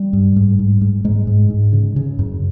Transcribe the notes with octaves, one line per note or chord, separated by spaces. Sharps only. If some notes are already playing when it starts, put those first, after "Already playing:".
Already playing: G3
G2
G#2
G#2
G#2
G#2 G#3
G#2
G#2
C#3
C#3
F#2